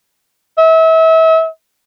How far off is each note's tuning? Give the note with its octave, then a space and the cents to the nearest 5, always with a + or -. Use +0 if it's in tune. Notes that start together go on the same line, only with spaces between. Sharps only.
E5 -35